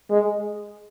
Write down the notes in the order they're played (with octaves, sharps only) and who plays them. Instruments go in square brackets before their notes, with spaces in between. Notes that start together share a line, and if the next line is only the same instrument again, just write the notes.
[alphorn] G#3